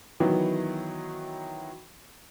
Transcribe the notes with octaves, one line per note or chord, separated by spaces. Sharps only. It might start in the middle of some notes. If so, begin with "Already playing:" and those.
D#3 E3 F#3 B3 E4